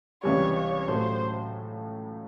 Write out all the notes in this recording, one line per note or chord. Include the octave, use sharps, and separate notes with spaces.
C#2 C3 E3 G3 C#5
C#5
A2 F#3 A3 C5